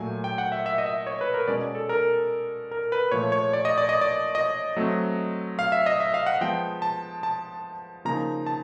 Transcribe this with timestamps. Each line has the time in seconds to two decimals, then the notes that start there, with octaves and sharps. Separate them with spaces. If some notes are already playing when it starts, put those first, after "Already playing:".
Already playing: A#2 F#3 A3 G#5
0.24 G5
0.38 F#5
0.52 E5
0.66 E5
0.78 D#5
0.86 E5
1.07 C#5
1.21 B4
1.34 A#4
1.47 B2 G#3 C#4 D5
1.61 D5
1.75 A4
1.89 A#4
2.71 A#4
2.92 B4
3.11 A#2 F3 A3 C#5
3.32 C#5
3.53 D5
3.65 D#5
3.78 D5
3.89 D#5
4.01 D5
4.35 D#5
4.76 F#3 A3 C4
5.59 F5
5.72 E5
5.86 D#5
6.00 E5
6.14 F5
6.26 F#5
6.41 F3 G#3 B3 G5
6.82 A5
7.23 A5
8.05 C#3 F3 A#3 D#4 A#5
8.47 A5